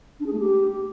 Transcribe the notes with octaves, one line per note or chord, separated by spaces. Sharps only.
D4
G#4
A3
G4